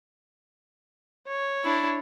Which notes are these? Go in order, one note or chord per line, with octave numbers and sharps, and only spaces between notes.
C#5
D4 E4